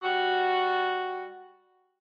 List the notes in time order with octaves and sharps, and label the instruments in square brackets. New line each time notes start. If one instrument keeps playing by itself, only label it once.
[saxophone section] G3 F#4